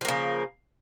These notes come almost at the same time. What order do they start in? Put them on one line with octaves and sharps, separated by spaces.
F3 A#3 C#3